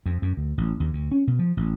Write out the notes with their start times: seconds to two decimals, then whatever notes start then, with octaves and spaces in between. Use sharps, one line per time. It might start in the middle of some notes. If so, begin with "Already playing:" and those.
0.06 F2
0.22 F#2
0.37 D2
0.58 A1
0.80 D#2
0.93 D2
1.12 C#4
1.27 B2
1.39 F3
1.57 A1